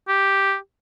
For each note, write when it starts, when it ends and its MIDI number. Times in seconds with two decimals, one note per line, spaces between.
0.08 0.55 67